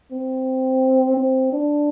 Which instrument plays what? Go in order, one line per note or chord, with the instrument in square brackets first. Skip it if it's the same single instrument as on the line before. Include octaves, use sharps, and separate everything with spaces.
[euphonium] C4
C4
D4